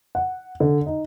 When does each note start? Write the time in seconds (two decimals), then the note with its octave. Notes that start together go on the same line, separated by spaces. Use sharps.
0.15 F#5
0.60 D3
0.86 D#4